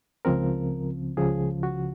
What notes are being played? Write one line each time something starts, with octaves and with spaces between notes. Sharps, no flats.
C#2 C#3 F3 C4 A#4
C#2 C#3 F3 G#4
F#4